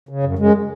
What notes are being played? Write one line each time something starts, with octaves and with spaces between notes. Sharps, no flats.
C#3
F#2
F#2 G#3